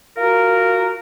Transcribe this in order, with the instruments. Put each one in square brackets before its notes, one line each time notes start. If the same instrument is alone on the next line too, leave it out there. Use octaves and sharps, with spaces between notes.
[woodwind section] F4 F#4 A#4